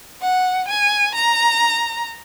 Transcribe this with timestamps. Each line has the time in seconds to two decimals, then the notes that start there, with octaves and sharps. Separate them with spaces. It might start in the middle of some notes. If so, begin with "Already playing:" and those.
0.21 F#5
0.68 G#5
1.16 A#5